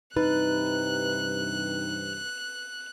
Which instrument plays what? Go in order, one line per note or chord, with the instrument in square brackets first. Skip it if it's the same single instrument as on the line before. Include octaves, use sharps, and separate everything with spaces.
[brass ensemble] G2 C3 E3 [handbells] D#4 [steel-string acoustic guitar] B4 [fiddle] F#6